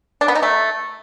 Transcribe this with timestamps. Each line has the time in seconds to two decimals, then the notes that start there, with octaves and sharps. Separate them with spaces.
0.21 D4
0.28 B3
0.35 D#4
0.43 A3